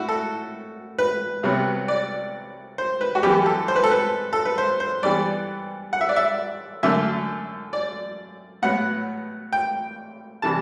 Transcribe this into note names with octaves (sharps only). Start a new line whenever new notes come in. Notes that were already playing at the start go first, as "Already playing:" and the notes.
Already playing: A2 E4 F#4
A4
B4
C2 C3 F#3 B3
D5
C5
B4
F#4
F#2 E3 G3 B3 G4
A4
C5
B4
A4
B4
A4
B4
C5
C5
G2 E3 G3 B3 D5
F#5
E5
D5
E5
F#2 D3 A3 E5
D5
A2 F#3 B3 F#5
G5
C3 E3 G3 A5